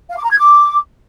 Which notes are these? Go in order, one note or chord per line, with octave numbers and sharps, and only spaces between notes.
F5
D6
A#5
G#6
D6